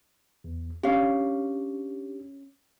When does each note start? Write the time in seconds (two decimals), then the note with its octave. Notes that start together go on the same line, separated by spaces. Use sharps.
0.44 E2
0.83 C#4 D4 G4 F5